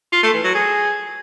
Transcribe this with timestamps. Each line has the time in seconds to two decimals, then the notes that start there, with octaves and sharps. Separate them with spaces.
0.12 F4
0.23 A3
0.33 E3
0.44 F#3
0.54 G#4